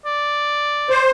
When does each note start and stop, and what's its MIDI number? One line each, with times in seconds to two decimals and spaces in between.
0.06 1.09 74
0.90 1.11 72